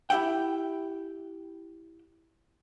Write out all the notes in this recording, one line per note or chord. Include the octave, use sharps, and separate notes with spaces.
E4 G4 E5 F#5 G5